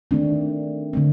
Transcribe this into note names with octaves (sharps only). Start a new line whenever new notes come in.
D#3 A3 C4 D4
D3 A3 C4